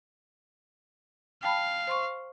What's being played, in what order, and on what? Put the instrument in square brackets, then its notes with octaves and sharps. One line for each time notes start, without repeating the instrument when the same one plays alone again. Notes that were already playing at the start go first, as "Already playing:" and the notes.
[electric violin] F5 [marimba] G5 A5 B5
[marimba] C5 C6 C#6